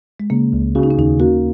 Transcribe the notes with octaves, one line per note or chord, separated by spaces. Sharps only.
G#3
C#3 A#3
C#2
C#3 F#4
D#4
C#4
D#2 D#4
A#3 F#4